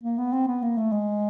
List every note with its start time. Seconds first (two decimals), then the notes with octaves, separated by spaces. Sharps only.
0.03 A#3
0.18 B3
0.33 C4
0.47 B3
0.62 A#3
0.78 A3
0.92 G#3